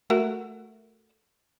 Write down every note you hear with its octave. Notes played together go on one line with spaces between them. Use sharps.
A3 F#4 A#4